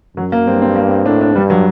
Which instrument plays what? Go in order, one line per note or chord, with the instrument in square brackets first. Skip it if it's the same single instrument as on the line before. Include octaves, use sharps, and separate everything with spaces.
[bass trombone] F#2 [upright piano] F#3
[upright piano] A#3
[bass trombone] G2 [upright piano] C4
[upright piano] C4
A#3
C4
[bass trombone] A2 [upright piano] D4
[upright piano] D4
[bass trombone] G2 [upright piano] G3
[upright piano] F#3